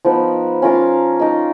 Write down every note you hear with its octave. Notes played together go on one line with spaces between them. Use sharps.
F3 B3 D#4 A#4
C#4 F4 A#4 F5
D#4 A#4 D#5